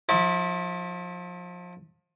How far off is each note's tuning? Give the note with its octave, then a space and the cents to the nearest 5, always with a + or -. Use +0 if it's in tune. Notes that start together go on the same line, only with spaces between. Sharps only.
F3 +30 E4 -25